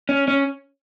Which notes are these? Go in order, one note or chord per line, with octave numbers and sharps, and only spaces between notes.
C#4
C#4